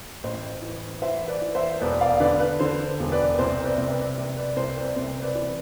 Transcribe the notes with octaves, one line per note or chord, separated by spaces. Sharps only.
A1 C5
E3
E3 C5 E5
B4 D5
E3
C5 E5
E1 B4 D5
D5 F5
D3 B4 D5
B4
D3 C5
E1
B4 D5
C2 C5
B4 D5
C3
B4 D5
C3
B4 D5
C2 C5
B4 D5
C3 C5
B4 D5
E3